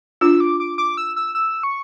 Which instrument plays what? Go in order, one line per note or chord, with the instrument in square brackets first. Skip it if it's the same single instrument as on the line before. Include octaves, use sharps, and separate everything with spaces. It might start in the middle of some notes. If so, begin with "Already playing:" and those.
[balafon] D4 F4 [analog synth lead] E6
[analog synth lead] D6
D6
D6
E6
E6
E6
C#6